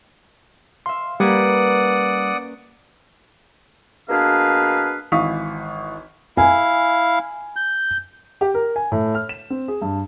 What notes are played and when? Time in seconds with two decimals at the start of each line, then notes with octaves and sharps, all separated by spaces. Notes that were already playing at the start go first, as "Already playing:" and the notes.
0.86 E5 F5 C6
1.20 G3 A#3 C#4 B4 D5 F#5 D#6
4.09 B2 A#3 D4 G#4 B4 F5
5.12 G#1 E3 F5 C#6 D#6 B6
6.37 E4 F5 G#5
7.56 G6
8.41 G4
8.54 A#4
8.76 G#5
8.92 A2
9.15 F6
9.29 E7
9.50 C4
9.68 G#4
9.82 G2